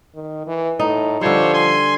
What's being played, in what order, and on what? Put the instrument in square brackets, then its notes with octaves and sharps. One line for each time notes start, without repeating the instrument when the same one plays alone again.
[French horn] D#3
E3
[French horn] A2 [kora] D#4
[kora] D3 G3 [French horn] F3 [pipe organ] C5 C#5
[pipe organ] G#5 C6